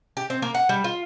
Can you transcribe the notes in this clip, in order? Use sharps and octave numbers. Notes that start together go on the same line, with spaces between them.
G4
C4
A#3
F#5
G3
F4